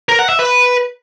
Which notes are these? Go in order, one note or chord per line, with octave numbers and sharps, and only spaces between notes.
A#4
F#5
E5
B4